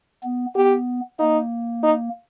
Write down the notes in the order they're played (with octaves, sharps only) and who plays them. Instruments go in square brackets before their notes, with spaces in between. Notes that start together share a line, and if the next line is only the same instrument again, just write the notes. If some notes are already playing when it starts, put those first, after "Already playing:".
[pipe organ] B3
[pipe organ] B3 [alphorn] G4
[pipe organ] A#3 [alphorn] D#4
[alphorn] D#4